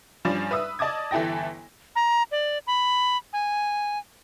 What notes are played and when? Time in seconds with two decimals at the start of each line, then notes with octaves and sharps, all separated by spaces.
0.25 G2 F3 G3 C#4 D5 G#5
0.51 B4 E5 D#6 E6
0.79 D5 D#5 A5 D6 D#6 G#6
1.11 G1 E3 E4 A4 G5 A#6
1.96 A#5
2.32 D5
2.67 B5
3.33 G#5